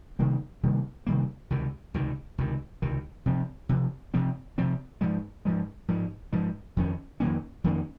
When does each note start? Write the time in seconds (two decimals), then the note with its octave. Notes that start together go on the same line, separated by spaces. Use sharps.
0.19 C3 D#3 G3 A#3
0.63 C3 D#3 G3 A#3
1.07 C3 D#3 G3 A#3
1.50 C#2 C3 D#3
1.94 C#2 C3 D#3
2.38 C#2 C3 D#3
2.82 C#2 C3 D#3
3.26 C3 F3 C4
3.69 C3 F3 C4
4.14 C3 F3 C4
4.58 C3 F3 C4
5.01 G#2 F3 G#3
5.45 G#2 F3 G#3
5.88 G#2 F3 G#3
6.33 G#2 F3 G#3
6.77 F2 D#3 A#3 C#4
7.20 F2 D#3 A#3 C#4
7.64 F2 D#3 A#3 C#4